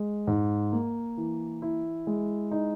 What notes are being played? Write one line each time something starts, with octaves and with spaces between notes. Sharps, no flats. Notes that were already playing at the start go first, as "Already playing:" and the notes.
Already playing: G#3
G#2
A#3
E3
E4
G#3
D#4